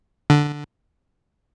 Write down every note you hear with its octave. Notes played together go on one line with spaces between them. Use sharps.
D3